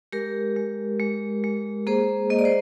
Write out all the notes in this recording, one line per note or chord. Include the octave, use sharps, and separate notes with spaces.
G#3 G4 A#4
G#3
G#3
G#3
A#3 G#4 C5
A#3 D#5
D5
C5